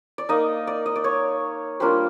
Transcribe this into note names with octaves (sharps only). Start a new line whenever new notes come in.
D5
A#3 D#4 D#5
D5
D#5
D5
C#5
G3 A#3 D4 F4 C5